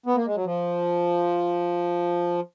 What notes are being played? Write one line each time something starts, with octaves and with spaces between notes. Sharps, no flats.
B3
A#3
G#3
F#3
F3